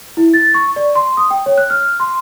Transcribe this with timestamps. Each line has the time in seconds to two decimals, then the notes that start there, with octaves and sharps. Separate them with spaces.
0.17 E4
0.34 A6
0.54 C#6
0.76 D5
0.95 C6
1.17 D#6
1.31 G5
1.46 C#5
1.58 F#6
1.70 F6
2.00 C6